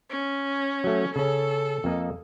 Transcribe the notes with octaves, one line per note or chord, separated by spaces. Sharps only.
C#4
F#3 A3
C#3 C#4 A4
F2 A#3 D#5